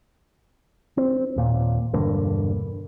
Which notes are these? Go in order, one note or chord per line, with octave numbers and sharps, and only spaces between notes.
C4
D#2 A#2
E1 G2 D3 A#3